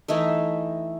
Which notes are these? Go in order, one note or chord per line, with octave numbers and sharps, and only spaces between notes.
E3 A3 D#4 E5